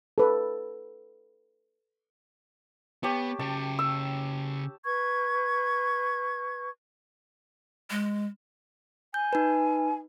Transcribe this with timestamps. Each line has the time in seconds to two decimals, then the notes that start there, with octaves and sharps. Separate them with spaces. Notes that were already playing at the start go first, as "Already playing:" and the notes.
0.18 A4 B4
3.03 B3 G4 C#5 A5
3.39 C#3 G5 A5
3.79 E6
4.84 B4 C#6 G#6
7.90 G#3
9.14 G#5 G6
9.33 D#4 B4